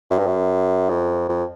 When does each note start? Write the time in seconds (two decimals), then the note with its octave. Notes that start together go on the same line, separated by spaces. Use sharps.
0.11 F#2
0.18 G2
0.27 F#2
0.89 F2
1.29 F2